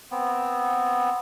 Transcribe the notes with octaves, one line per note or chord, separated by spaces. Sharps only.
B3 C4